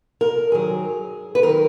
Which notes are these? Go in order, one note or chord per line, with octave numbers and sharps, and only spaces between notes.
A#4
G#2 D#3 F#3 G#4
B4
D#3 F#3 A#4